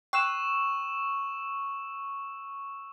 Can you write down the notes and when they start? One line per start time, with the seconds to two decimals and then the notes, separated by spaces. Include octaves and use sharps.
0.13 G5 C#6 E6 F#6 E7